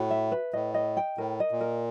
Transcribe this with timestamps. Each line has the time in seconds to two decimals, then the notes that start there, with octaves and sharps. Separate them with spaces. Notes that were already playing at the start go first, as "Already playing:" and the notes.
Already playing: A2 F#4
0.11 E5
0.32 B4
0.53 A2 D#5
0.74 D#5
0.97 G5
1.18 A2 A#4
1.40 D#5
1.51 A#2
1.61 A#4